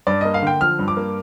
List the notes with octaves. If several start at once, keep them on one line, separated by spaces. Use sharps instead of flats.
G2 D5
A#3 D#5
F5
D3 G5
F3 F6
G2
D6
A#3